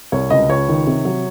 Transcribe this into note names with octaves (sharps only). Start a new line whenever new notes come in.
C2 C#5
C#2 D#5
C#2 C#5
D#3
C3
F#3